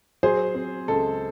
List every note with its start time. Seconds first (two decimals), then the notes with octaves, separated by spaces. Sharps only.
0.23 F#3 G#4 C5
0.55 C4
0.88 C#2 A4